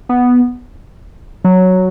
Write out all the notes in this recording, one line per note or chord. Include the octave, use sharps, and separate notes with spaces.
B3
F#3